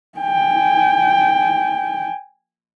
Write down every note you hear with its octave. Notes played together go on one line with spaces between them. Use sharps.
G5 G#5